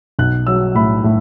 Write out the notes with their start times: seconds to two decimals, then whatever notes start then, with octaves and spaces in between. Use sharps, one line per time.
0.19 B1 F#6
0.47 F#3 E6
0.75 A2 B5
1.04 A2